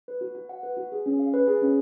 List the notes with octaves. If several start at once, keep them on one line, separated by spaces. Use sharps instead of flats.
B4
F#4
F#4
F#5
B4
F#4
G#4
C#4
F5
B4
G#4
C#4